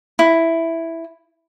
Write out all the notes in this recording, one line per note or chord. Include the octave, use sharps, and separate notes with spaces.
E4